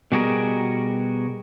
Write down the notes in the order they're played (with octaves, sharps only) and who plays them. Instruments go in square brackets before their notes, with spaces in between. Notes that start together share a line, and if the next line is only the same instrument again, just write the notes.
[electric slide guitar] B2 G3 F#4 G#4 A#4